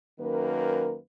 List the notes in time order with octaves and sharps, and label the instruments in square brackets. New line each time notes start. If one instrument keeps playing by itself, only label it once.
[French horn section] F#2 D#3 A#3 A#4 B4